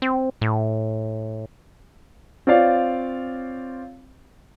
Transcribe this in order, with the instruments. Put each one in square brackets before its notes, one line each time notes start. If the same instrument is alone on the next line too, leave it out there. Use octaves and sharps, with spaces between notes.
[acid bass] C4
A2
[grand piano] C4 F4 C#5 D5 F5